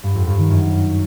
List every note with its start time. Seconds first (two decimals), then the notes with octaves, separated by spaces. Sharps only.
0.03 G2
0.15 F2
0.27 G2
0.38 D#3
0.50 F#2